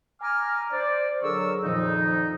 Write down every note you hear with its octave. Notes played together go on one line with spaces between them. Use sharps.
G#5 A#5 D6 F6
C5 D5
D3 F#3 G#4 A#4 C#6 E6
F2 A#2 D#3 F3 D#4